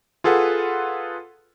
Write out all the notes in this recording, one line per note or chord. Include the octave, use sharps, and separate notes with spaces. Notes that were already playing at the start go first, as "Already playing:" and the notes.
F4 G#4 A4 B4 F#5